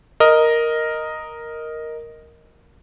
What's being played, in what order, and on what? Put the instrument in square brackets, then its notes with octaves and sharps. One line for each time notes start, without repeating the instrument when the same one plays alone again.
[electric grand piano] A#4 D#5